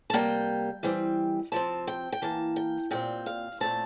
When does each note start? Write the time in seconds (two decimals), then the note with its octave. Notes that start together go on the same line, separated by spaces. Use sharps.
0.10 A5
0.13 C3 G3 A#3 G5
0.83 E3 G3 C4
1.52 C3 F3 C4 A5
1.87 G5
2.12 G5
2.22 E3 A#3 A5
2.56 G5
2.91 A#2 G3 C4 G5
3.26 F5
3.60 A#2 A3 C4 A5